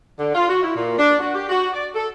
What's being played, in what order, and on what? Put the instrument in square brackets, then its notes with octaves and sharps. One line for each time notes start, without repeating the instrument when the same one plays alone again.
[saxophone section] D3
F4
F#4
E4
A#2
D4
F#4
G4
F#4
D5
A4